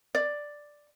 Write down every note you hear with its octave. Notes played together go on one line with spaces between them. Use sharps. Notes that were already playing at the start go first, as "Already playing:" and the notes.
D5